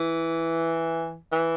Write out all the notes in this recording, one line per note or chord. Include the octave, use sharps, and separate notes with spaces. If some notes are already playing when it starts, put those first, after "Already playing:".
Already playing: E3
E3